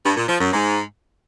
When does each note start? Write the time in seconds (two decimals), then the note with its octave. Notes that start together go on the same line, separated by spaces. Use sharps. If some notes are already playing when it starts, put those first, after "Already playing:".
0.05 G2
0.17 A#2
0.29 F3
0.40 F#2
0.52 G#2